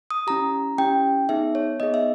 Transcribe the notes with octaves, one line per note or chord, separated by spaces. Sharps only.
D#6
C#4 E4 G4 A#5
C#4 E4 G4 G5
B3 D#4 G#4 E5
C#5
B3 D#4 G#4 D#5
E5